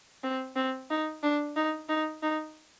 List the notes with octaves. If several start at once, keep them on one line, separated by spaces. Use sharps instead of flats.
C4
C4
D#4
D4
D#4
D#4
D#4